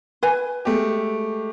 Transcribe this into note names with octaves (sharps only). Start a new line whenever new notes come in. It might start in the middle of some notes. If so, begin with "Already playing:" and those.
B4 G#5
G#3 A3 G4